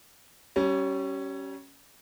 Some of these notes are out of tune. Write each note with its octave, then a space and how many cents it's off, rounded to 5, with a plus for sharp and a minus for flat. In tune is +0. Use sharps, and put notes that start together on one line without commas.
G3 -30 C#4 +0